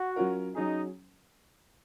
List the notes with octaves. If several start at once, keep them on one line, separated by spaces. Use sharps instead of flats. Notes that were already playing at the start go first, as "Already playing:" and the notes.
Already playing: F#4
F#3 C#4 F4 A#4
F#3 C#4 D#4 G#4